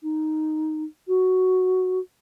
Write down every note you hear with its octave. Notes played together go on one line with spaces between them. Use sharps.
D#4
F#4